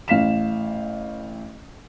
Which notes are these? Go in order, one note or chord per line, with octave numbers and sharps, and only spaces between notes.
A1 F5 B6 E7